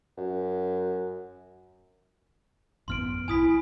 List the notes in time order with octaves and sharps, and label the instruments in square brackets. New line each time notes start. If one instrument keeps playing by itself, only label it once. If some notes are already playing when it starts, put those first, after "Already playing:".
[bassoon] F#2
[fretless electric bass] A1 F#2 B3 [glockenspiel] C6 F6 D7
[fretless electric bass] E1 B1 [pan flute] E4 [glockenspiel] G#5 D#6 B6